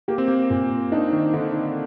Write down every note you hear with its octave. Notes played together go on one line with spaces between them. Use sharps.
A#3 G4
C4
A#3
A#2
D4 D#4
D#3
D3 D#4